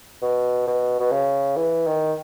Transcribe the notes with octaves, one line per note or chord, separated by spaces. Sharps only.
B2
B2
B2
C#3
E3
D#3